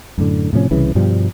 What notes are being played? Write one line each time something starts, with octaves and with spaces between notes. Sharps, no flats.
F#2 A2 D3
A2 C3 F3 C#4
C2 C#3 E3
G2 B2 F3 G3